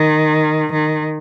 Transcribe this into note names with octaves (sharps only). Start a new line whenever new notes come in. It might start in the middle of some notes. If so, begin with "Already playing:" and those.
Already playing: D#3
D#3